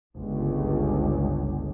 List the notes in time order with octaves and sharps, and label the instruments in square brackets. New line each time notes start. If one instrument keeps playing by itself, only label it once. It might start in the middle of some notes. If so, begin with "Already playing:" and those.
[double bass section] G1 C#2